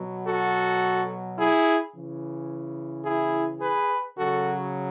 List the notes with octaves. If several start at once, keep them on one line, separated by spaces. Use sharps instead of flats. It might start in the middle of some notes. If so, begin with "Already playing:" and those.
Already playing: B2 F#3
F#4 A4
E4 G#4
C#3 E3
E4 G#4
G#4 B4
C#3 F#3 F#4 A4